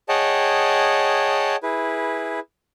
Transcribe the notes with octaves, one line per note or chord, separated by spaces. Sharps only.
G#4 C#5 D#5 F#5 G5 A5
E4 G#4 B4